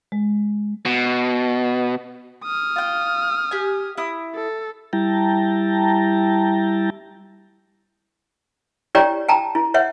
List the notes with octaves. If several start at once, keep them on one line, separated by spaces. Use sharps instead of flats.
G#3
B2
D#6 F6
F4 G5
G4 G#5
E4 D#6
A4
G3 E4 G5 A5 A#5
E4 G4 C#5 D5 G5 A#5
G5 A5 A#5
E4
C#5 E5 F#5